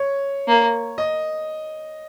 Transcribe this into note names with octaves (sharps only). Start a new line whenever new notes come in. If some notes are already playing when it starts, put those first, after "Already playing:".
Already playing: C#5
A#3
D#5